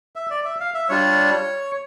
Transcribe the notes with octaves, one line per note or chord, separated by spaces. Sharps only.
E5
D5
E5
F5
E5
G3 D4 F4 C#5